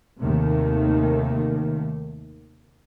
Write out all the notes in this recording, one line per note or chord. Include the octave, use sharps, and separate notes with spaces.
D#2 C3 D#3 A3